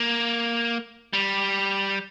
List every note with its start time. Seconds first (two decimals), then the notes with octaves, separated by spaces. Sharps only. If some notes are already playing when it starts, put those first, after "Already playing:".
Already playing: A#3
1.13 G3